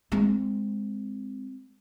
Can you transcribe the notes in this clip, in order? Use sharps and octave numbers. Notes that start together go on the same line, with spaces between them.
G#3 C4